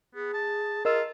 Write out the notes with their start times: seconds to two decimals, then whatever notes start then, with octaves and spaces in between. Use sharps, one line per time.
0.15 B3 G#4
0.34 A5
0.85 F4 A#4 D#5 E6